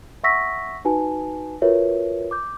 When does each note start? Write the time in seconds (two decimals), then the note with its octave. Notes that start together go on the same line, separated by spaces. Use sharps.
0.24 E5 F#5 C#6 E6 A#6 B6
0.85 D#4 F#4 B4 G#5 A5
1.62 F4 F#4 A#4 B4 C#5 E5
2.31 D6 G6